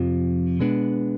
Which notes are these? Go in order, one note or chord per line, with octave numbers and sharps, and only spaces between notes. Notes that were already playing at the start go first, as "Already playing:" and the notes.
Already playing: F2 C3 F3
B2 G#3 B3 D4